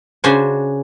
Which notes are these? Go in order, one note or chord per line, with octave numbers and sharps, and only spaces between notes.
C#3 D4 F#4 C5 G#5